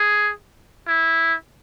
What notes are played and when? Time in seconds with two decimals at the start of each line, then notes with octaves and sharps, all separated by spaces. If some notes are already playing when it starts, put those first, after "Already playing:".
Already playing: G#4
0.88 E4